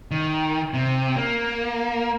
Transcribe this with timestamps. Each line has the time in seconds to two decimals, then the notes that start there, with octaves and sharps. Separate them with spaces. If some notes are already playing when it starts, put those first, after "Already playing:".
0.11 D#3
0.74 C3
1.17 A#3